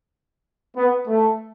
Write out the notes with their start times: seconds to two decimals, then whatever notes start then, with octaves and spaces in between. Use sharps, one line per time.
0.77 B3
1.08 A3